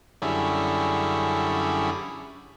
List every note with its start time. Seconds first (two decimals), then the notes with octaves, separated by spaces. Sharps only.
0.22 F#2 D3 G3 C#4 E4 G#4